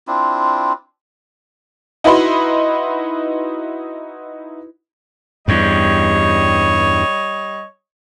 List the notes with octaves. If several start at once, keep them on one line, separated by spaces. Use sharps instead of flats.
C4 D4 E4 F4
D#4 E4 F#4 B4 B5 C6
E2 G2 G3 C#5 D#5